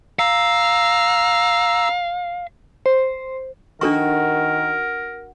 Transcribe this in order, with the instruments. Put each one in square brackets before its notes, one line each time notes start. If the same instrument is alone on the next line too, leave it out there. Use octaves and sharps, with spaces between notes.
[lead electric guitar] F5 [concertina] A#5 E6
[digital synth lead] C5
[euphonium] D#3 [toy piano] D4 A4 C#6 [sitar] F#4 [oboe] A#4